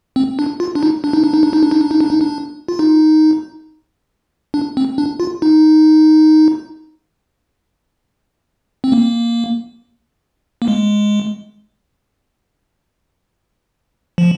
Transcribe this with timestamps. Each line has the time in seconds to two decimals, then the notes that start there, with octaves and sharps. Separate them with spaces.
0.16 C4
0.39 D4
0.60 F4
0.75 D4
0.83 D#4
1.04 D4
1.13 D#4
1.24 D4
1.34 D#4
1.43 D4
1.53 D#4
1.63 D4
1.71 D#4
1.81 D4
1.91 D#4
2.01 D4
2.10 D#4
2.21 D4
2.68 F4
2.79 D#4
4.54 D4
4.77 C4
4.98 D4
5.20 F4
5.42 D#4
8.84 C4
8.92 A#3
10.62 A#3
10.68 G#3
14.18 F3